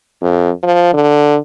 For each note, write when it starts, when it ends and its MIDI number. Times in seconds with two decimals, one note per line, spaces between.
0.22 0.50 41
0.63 0.93 53
0.94 1.38 50